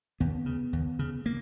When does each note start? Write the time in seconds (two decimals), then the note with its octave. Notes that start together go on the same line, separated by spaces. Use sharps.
0.20 D#2 B3
0.46 C#3
0.73 D#2
0.99 C#3
1.26 A#3